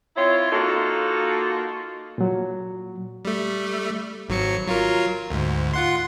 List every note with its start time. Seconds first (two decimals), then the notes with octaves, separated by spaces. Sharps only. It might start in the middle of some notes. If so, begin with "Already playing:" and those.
0.16 C4 E4 F4 C#5
0.52 A#3 D#4 F4 F#4 A4
2.18 A#2 F#3
3.25 G3 A3
4.29 G#1 F#3 C#7
4.67 F#3 F4 A#4
5.30 D2 G#2
5.73 F4 F#5 C6